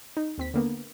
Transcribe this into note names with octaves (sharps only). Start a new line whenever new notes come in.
D#4
D#2 C4 B6
D3 A#3 B3